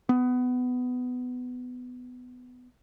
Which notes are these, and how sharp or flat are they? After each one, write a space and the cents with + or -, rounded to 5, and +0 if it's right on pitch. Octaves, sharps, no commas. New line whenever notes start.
B3 +15